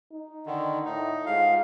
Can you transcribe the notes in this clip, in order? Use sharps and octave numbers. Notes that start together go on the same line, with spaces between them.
D#4
D3 D#3
A2 D#4
G#2 F4 F5